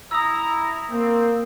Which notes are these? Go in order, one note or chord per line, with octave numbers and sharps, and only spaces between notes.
E4 A#5 D#6 E6
A#3 C4